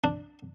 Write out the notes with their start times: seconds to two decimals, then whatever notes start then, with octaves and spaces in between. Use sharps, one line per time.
0.04 D4